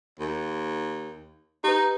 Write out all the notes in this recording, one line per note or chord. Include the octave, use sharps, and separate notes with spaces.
D#2
D#4 G4 B4